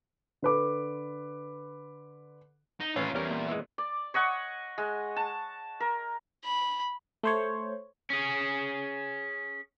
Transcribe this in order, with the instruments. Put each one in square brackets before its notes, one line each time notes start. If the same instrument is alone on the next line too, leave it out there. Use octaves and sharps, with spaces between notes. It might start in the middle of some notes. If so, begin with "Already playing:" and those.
[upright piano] D3 B4 D6
[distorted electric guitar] D#4
[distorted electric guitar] D#2 F4 [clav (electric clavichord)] A2 E3 [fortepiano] C#4
[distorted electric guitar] E2 [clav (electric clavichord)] G3 A#4 [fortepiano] C#4
[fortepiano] A#2
[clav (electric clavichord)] E3 G#3
[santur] D5
C#5 D#5 F#5 C#6
G#3
A5
A#4
[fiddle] B5
[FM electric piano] A3 C5 C#5
[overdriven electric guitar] C#4 G#4